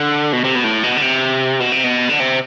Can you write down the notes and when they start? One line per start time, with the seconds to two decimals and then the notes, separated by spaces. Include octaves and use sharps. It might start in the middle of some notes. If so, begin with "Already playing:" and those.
Already playing: D3
0.33 B2
0.44 C3
0.55 B2
0.64 A2
0.83 B2
0.97 D3
1.02 C3
1.60 B2
1.72 C3
1.84 B2
2.09 D3
2.20 C3